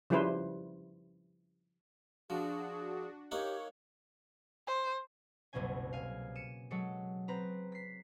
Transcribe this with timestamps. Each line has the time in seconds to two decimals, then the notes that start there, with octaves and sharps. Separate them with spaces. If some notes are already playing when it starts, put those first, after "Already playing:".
0.10 C#3 F3 G3 E4 B4 C5
2.30 F3 D4 F#4 G#4
3.31 A#3 D#4 G4 C#5 F#5
4.67 C5
5.53 F#1 C2 B2 A#3 C#4 G#5
5.93 F5 G#5
6.35 C#7 D#7 E7
6.71 F#3 G#3 A4 C#7
7.28 C4 B4 A#5
7.72 B6 C7